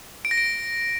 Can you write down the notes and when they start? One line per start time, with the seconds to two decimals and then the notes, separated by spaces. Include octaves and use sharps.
0.25 D7
0.31 A#6
0.38 D7